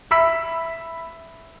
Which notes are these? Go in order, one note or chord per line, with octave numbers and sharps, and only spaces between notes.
E5 B5 E6 B6